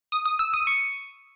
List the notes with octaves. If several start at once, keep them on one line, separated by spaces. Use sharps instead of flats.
D#6
D#6
E6
D#6
C#6